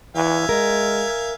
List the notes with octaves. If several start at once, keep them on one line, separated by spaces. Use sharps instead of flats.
E3 E5 F5 G#5
G#3 A#4